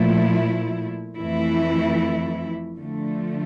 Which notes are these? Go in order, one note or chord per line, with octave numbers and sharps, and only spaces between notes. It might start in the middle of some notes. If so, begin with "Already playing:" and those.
Already playing: A#2 F3 A3 E4
F2 E3 A3 E4
D3 F3 A3